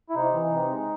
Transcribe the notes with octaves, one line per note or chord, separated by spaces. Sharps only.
E4
C3 D#4
E3
C3
G#3